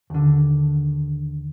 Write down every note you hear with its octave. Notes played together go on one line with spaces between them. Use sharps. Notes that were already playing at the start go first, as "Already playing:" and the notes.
D#2 D3